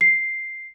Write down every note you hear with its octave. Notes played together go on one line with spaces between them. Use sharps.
C7